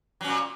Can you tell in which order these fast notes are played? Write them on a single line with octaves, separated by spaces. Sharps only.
F#3 C#4 A#2